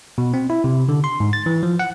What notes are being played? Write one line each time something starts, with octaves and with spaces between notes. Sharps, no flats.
B2
C4
E4
C3
D3
C6
G#2
A6
E3
F3
F#5